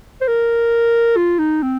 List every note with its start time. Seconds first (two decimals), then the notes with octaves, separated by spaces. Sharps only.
0.21 C5
0.27 A#4
1.16 F4
1.39 D#4
1.62 C4